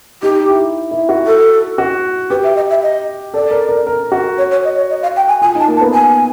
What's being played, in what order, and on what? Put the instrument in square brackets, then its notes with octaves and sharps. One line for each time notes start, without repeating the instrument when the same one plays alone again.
[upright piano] D#4 [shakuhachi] G4
[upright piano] E4
E4
F#4
[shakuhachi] A4
[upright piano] F#4
[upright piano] G4 [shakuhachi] B4
[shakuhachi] E5
D#5
E5
D#5
[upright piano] A4 [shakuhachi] D5
[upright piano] A#4
A#4
A#4
F#4
[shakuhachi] C#5
C#5
D#5
C#5
D#5
F5
G5
G#5
[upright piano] F4 [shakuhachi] G#5
[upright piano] D#4
[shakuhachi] A5
[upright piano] A#3
[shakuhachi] A5
[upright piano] B3
[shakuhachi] G#5